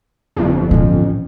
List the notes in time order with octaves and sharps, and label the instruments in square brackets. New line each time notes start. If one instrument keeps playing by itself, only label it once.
[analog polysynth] G1 F2
[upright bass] A1 C#4